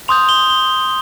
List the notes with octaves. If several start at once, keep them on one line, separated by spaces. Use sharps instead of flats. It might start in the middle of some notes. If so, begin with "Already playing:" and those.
C6 D#6 G6 F7
G7
G7